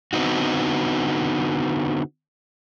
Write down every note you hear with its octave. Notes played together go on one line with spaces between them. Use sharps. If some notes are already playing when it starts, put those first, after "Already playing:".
D3 B3 C4 D#4 F#4